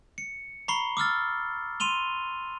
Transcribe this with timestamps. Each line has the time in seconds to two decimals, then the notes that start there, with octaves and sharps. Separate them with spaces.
0.18 C#7
0.68 A#5 B5 C#6 C7 G7
0.97 D6 E6 F6 A6
1.80 C6 D#7 F7 G7